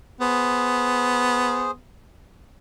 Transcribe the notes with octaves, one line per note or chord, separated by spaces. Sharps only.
B3 G#4 C5